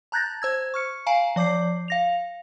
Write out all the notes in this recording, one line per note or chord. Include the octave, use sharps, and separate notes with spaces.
A5 A#5 F#6 G6 A6 A#6
C5 E6 G#6
C#6 F6 C#7
F5 G#5 A#5 C7 D7
F3 D5 D6 G6 C7
F5 A#6 F7